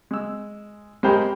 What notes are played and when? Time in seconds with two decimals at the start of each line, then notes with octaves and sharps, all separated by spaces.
0.11 G#3 E6
1.03 G#3 G4 A#4 C5 G5 B5